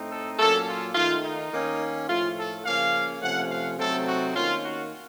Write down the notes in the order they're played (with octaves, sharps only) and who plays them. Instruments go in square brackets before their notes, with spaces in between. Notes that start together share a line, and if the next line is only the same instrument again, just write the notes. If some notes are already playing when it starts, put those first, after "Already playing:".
Already playing: [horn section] A2 A3 C4 D#4
A4
A#2 F#3 A#3 C#4 A4
F4
D#3 A3 D#4 F4
D#4
D#3 A#3 C#4
A2 F3 A3 F4
A4
C#3 F3 A#3 C#4 F5
C3 F3 A3 C#4 F#5
F5
C3 F#3 A3 C4 D#4 A4
F#4
D#3 A#3 C#4 F4
F#4